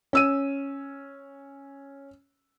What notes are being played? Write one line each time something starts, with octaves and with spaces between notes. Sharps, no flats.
C#4 E6 D#7